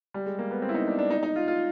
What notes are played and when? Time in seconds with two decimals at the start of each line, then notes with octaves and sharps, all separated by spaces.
0.14 G3
0.26 G#3
0.39 A#3
0.51 B3
0.62 C4
0.69 E4
0.74 D#4
0.87 D4
0.99 D4
1.11 D#4
1.23 D#4
1.36 F4
1.48 F4